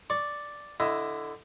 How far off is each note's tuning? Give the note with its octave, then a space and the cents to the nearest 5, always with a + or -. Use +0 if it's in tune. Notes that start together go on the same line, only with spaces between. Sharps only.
D5 +0 C#6 +0
D3 +0 E4 +15 D#5 +5